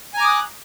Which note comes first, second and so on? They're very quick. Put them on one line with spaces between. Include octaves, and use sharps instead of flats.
G#5 A#5 D6 D#6 F#6